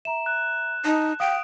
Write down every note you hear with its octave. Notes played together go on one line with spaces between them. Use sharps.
E5 A#5 E7
F#6
D#4 A5
F5 G5 D#6 D7